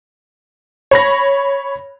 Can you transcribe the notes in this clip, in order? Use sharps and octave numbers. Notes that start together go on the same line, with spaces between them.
C#5 B5 A#6